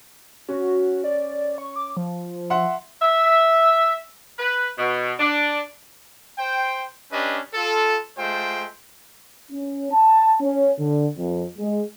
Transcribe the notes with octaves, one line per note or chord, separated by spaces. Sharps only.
C#4 F#4
D5
C#6
D6
F3
E5 F#5 C6
E5
B4
B2
D4
C5 G5
C#4 D4 G4 B4 D#5
F4 A4
G#3 A3 F4 C5 G5
C#4
A5
C#4
D3
F2
G#3